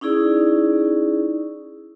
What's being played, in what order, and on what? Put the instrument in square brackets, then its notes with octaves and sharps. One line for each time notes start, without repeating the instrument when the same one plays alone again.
[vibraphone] C#4 D#4 E4 G#4 D5